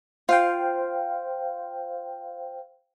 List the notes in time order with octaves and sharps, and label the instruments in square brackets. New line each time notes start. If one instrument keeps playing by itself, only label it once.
[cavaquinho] F4 [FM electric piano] C5 F5 G5